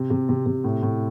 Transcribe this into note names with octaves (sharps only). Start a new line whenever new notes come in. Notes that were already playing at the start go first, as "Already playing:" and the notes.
Already playing: C3
C3
C3
C3
A2
A2